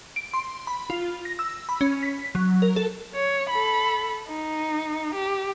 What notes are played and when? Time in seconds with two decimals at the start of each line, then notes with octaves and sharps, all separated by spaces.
0.16 D7
0.34 C6
0.67 B5
0.90 F4
1.25 A#6
1.39 E6
1.69 B5
1.81 C#4
2.03 B6
2.35 F#3
2.62 A#4
2.76 A4
3.15 C#5
3.49 A4 B5
4.28 D#4
5.15 G4